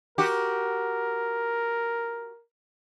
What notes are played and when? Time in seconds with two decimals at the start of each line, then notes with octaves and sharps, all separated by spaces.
0.18 F#4 G4 A#4